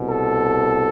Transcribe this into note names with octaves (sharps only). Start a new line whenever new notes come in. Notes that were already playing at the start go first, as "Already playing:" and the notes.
Already playing: C2 B2
A4